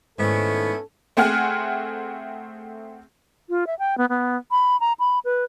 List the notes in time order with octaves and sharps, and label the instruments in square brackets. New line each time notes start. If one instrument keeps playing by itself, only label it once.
[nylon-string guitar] G#2 D#3 A3 [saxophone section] B3 C#4 E4 [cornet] A4
[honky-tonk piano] A3 C4 G#4 F#5 F6
[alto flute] F4
E5
G5
B3
B3
B5
A#5
B5
B4